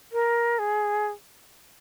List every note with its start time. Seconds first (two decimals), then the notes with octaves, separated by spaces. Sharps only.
0.12 A#4
0.59 G#4